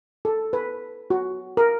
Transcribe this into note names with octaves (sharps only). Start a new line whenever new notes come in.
A4
B4
F#4
A#4